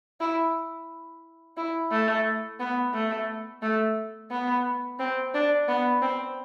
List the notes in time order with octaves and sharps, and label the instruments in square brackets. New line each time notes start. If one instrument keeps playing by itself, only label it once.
[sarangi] E4
E4
A3
B3
A3
A3
B3
C4
D4
B3
C4